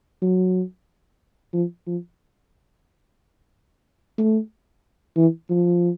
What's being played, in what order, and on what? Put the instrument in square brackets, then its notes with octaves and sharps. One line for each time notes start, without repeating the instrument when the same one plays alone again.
[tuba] F#3
F3
F3
A3
E3
F3